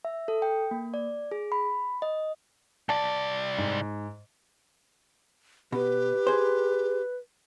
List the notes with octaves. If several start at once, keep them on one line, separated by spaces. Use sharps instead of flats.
E5
A4
G5
A#3
D5
G#4
B5
D#5
C2 D5 A5
G#2
B2 G4 B4
G#4 C5